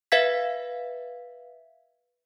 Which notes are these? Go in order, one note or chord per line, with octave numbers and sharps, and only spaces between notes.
B4 E5 F5 G#6 B6